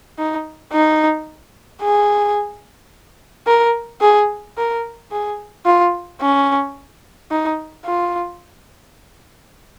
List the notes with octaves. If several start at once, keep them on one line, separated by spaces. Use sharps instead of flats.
D#4
D#4
G#4
A#4
G#4
A#4
G#4
F4
C#4
D#4
F4